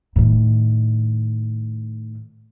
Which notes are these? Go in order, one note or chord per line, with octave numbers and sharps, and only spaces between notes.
A2 D#3